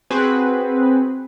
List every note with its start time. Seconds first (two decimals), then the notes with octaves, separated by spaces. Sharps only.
0.10 C4 F#4 G#4 B4